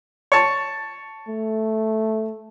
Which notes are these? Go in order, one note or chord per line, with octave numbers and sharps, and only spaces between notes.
C#5 A5
A3